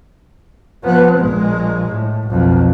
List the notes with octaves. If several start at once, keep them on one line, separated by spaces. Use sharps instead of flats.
F3 B3
A#1 G#3
A2
B1 F2